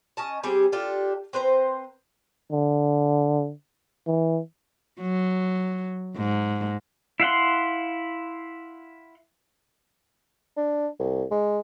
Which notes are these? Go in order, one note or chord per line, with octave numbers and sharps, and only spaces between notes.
C#4 D#5 A5
G3 C4 G4 G#4
D4 F4 G4 A4
C4 B4 C5 A#5
D3
E3
F#3
G#2
E4 F5 F#5 C6
D4
C2
G#3